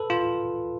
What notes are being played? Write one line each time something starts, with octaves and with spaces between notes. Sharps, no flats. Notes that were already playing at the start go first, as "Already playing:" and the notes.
Already playing: A4 B4
F4